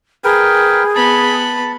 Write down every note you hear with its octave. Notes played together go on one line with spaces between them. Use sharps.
G#4 A#4 B4 G5
B3 A5 B5